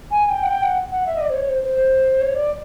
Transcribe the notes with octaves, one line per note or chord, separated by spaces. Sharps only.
G#5
G5
F#5
G5
F#5
F#5
E5
D#5
D5
C5
C#5
C5
C5
C#5
D5